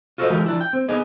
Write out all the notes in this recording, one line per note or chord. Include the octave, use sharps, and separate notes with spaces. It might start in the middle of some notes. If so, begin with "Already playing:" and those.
F4 F#4 A4 A#4 C5 D#5
E3 G#3 A3 F4 G4 A#4
F3 D4 E4
G5
C4
B3 D#4 G4 G#4 D#5